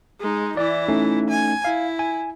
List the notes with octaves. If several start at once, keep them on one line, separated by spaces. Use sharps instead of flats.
G#3 D#4
E3 E4 D5
A3 C#4 D#4
G#5
E4 F5
G#5